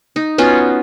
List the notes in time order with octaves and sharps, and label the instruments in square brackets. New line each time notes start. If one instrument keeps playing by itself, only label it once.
[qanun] D#4
B3 C#4 F4 F#4